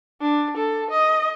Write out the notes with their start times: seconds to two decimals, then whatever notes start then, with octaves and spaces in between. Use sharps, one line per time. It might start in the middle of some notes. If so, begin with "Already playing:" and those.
0.21 D4
0.57 A4
0.90 D#5